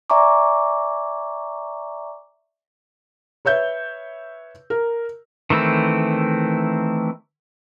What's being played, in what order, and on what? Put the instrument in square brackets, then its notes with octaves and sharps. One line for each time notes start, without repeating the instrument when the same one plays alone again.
[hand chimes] D5 E5 G#5 A#5 C#6 D6
[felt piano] B4 C#5 E5 G6
A#4
[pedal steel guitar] D#3 E3 A3 C4 E4